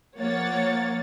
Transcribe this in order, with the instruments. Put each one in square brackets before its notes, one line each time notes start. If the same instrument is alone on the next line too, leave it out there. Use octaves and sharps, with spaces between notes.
[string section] F3 A#3 C#5 F#5 A6